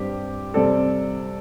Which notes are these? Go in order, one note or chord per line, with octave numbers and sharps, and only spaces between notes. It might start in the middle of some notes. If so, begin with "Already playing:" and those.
Already playing: G2 G3 C4 G4
C3 G3 C4 A4 D5